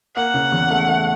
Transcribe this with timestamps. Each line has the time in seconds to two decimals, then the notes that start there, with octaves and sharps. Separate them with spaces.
0.16 A#3 F#5
0.34 C#3
0.52 E2
0.70 A3
0.88 A3